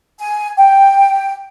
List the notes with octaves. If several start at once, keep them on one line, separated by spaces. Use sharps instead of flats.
G#5
G5